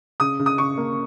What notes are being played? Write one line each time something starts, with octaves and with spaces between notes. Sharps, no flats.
C#3 D#6
C#3
D#6
C#3 C#6
A#3